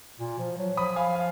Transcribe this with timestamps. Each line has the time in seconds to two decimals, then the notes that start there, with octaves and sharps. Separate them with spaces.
0.20 A#2
0.39 F3
0.58 F#3
0.77 F3 B5 D#6
0.96 F5 G#5
1.15 F5